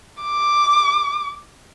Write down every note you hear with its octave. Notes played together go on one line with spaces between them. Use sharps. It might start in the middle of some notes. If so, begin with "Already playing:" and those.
D6